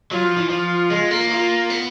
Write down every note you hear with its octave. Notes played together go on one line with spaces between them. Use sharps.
F#3 F4
F3
E3
F3 F4
G#3
A#3
F4
B3